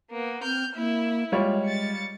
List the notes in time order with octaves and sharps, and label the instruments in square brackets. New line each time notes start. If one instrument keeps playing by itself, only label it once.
[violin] A#3 B3
[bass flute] C4 [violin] F6 G6
[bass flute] A#3 [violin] E4
[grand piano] G3 F4 C#5 [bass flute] G#3
[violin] A6 C#7